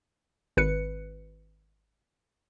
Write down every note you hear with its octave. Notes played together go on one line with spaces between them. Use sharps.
G#1 B4 C#7